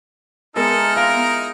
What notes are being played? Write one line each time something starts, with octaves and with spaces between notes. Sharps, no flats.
G#3 B3 D#4 E4 A4 A#4 D#5 F6
F4 A#4